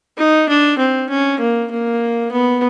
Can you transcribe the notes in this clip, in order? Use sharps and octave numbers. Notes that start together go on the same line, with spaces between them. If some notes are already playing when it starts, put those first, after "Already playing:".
D#4
D4
C4
C#4
A#3
A#3
B3